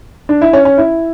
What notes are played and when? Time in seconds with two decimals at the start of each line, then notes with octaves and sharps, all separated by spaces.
0.29 D4
0.41 E4
0.53 C#4
0.65 C#4
0.78 E4